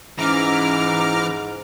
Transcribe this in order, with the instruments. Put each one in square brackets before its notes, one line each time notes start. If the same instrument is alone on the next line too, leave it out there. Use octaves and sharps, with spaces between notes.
[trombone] G#2 [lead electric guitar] E3 [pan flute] C#4 [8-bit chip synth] A#5 D6 F6